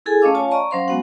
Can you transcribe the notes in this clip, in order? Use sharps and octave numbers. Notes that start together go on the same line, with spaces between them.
E4 G#4 A4 G#5
A3 C#4 D#5 F5 D6 E6
F4 C#5 F5 G#5 A5
D5 D#5 A#5 C#6
F#3 C#4 C5 F5 C6 C#6
F#3 G#3 B3 F#4 F#5